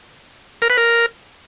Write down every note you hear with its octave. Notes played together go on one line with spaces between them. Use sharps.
A#4
B4
A#4